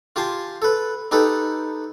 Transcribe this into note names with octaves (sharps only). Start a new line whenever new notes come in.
F4 G4 G#5 A5 C6
A4 B4
D#4 G4 A4 B4